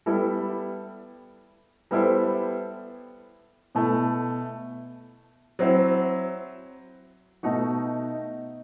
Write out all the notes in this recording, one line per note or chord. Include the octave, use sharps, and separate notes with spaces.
G3 B3 E4 A4
G3 B3 E4 A4 C5
B2 A3 E4 A4
F#3 C4 E4
B2 A3 D#4 F#4